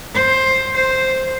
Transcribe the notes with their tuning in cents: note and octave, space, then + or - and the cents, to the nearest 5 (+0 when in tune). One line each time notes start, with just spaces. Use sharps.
C5 +10
C5 +0